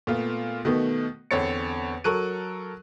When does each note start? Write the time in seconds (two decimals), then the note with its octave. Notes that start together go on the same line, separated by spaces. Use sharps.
0.07 A#2 A3 B3 F4
0.65 B2 D#3 A3 B3
1.31 E2 D3 C4 C#5 A6 C#7
2.04 F#3 A4 A#4 C#6 F#6 D#7